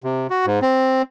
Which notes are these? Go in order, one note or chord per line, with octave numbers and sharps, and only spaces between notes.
C3
F#4
G#2
C4